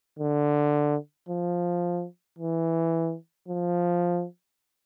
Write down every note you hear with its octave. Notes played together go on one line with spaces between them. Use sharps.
D3
F3
E3
F3